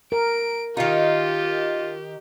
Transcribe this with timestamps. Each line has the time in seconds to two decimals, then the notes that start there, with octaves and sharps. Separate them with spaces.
0.12 A#4 D7
0.77 D#3 D#4 F4 G4